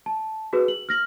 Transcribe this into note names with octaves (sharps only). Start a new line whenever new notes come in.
A5
F#4 G#4 B4
F#7
F6 A#6 F#7